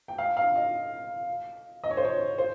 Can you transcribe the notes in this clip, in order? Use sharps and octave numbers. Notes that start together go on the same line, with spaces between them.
G5
F5
F5
D#5
D#5
C#5
C5
C#5
C5